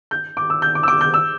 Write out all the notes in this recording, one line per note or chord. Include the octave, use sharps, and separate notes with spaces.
G6
D6
E6
G6
D6
E6
D6
G6
E6